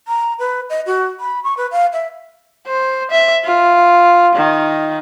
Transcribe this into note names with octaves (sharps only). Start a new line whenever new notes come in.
A#5
B4
D#5
F#4
B5
C#6
B4
F5
E5
C5
E5
F4
D#3